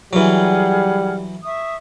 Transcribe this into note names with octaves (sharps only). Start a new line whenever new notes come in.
E3 F#3 G3 G#4 F#5 F6
E5 C#6 D#6